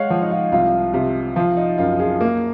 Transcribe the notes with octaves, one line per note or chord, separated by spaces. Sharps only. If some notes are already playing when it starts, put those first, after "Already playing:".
Already playing: G#3 C#5 D#5 F5 F#5
F3
D#4
F4
C2 F4
C3
F3 F4
D#4
F#2 F4
F4 G#4
A#3